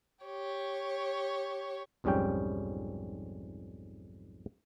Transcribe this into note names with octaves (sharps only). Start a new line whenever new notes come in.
G4 C#5
B1 F2 G#2 G3 C#4 G5